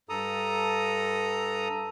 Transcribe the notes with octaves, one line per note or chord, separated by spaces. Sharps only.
G2 A4 A#5 D#6